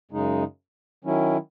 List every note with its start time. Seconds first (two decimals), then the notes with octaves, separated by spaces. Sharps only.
0.11 F#2 C#3 G#3 D#4
1.04 D#3 F#3 C#4 E4